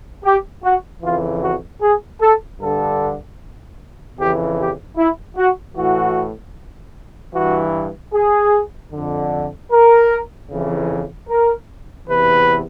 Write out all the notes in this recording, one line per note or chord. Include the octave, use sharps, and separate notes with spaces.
G4
F#4
F2 C#3 E3 F4
F#4
G#4
A4
G2 D3 A4
F2 C#3 E3 G4
G4
E4
F#4
A2 E3 F#4
G2 E3 F#4
G#4
F2 D3
A#4
F2 C#3 E3
A#4
E2 C3 E3 B4